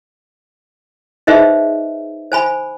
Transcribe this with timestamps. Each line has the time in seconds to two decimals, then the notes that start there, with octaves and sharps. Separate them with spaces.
1.27 D#4 G#4 B4 C5 D#5 E5
2.32 C5 G#5 B5